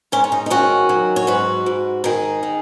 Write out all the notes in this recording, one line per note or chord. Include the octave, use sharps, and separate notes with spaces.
G#2 C#4
C#4
D#4
D#4
D#3 C#4 F#4
F#3
C#5
G#2 F#4 B4
G#2
D#3 D#4 G#4
D#3